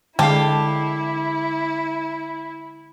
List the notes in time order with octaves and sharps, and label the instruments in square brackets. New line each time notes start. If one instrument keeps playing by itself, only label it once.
[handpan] D3 G#3 [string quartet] E4 [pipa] G4 [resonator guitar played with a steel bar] F5 A5